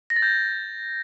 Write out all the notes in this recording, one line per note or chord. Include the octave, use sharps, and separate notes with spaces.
A#6
A6
G6